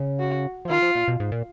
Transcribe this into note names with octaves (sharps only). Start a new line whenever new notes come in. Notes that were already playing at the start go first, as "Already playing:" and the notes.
Already playing: C#3
F#4
F3
D#3 F4
F3
A#2
B2
G#2
A#2